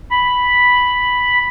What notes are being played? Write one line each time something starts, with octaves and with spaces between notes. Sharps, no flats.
B5